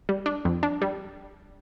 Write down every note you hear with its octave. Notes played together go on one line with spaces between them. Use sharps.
G3
D4
F2
D4
G3